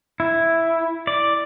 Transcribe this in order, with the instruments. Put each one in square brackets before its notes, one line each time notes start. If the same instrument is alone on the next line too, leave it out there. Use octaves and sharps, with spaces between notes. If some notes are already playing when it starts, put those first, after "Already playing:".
[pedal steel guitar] E4
D5